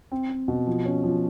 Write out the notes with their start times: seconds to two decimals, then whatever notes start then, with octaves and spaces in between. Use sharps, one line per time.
0.12 C4
0.29 C4
0.48 B2
0.67 F3
0.85 C#4
1.04 F3